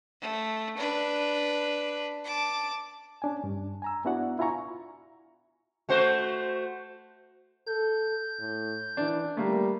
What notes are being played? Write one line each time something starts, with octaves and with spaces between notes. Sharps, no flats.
A3
D4 B4
A5 D6
C#4 D4 G#5
G2
G#5 A#5 E6
B3 D4 E4 F#4 D5 F#5
E4 F4 G#5 A#5 C#6
A3 F#4 C5
A4 G6
A2
E3 D4
G3 A3 A#3